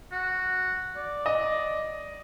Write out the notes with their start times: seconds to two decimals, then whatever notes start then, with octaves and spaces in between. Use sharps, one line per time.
0.12 F#4
0.96 D5
1.26 D#5